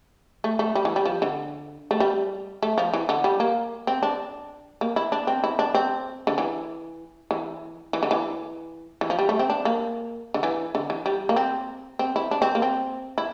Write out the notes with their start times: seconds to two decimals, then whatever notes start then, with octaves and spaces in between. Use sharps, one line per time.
0.44 A3
0.59 A3
0.75 G3
0.85 E3
0.96 G3
1.06 F3
1.22 D3
1.91 A3
2.00 G3
2.63 A3
2.78 F3
2.94 E3
3.09 D3
3.24 G3
3.40 A#3
3.87 C4
4.03 D4
4.81 A#3
4.96 E4
5.12 D4
5.27 C4
5.44 E4
5.59 D4
5.75 C4
6.27 D3
6.38 E3
7.31 E3
7.93 E3
8.03 D3
8.11 E3
9.01 E3
9.10 F3
9.19 G3
9.29 A3
9.39 C4
9.50 D4
9.65 A#3
10.34 D3
10.43 E3
10.75 D3
10.90 E3
11.06 G3
11.29 A#3
11.36 C4
11.99 C4
12.16 E4
12.31 D4
12.42 C4
12.55 A#3
12.62 C4
13.18 E4